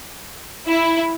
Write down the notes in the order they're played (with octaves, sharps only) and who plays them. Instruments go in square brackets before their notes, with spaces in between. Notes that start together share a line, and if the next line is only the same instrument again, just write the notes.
[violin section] E4